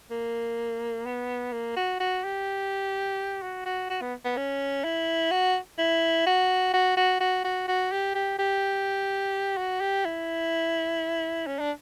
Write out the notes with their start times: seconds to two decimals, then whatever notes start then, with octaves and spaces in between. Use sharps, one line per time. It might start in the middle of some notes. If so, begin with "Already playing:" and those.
0.11 A#3
1.06 B3
1.53 A#3
1.76 F#4
2.00 F#4
2.24 G4
3.42 F#4
3.66 F#4
3.90 F#4
4.01 B3
4.25 B3
4.37 C#4
4.84 E4
5.31 F#4
5.78 E4
6.26 F#4
6.73 F#4
6.97 F#4
7.20 F#4
7.44 F#4
7.68 F#4
7.91 G4
8.15 G4
8.38 G4
9.57 F#4
9.80 G4
10.05 E4
11.46 C#4
11.59 D4